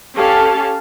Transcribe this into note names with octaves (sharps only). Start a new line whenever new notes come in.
C#4 G4 A4 F5 A5